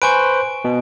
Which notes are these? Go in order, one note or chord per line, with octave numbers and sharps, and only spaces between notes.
B4 C5 G#5 C#6 D7
B2